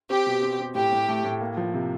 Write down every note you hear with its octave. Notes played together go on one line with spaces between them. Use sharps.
C4 G4
B2
C4
C4
A2 G4
A2
A3
A2
A#3
F3
C3